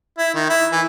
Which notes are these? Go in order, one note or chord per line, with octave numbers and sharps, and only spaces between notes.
E4
D#3
E4
E3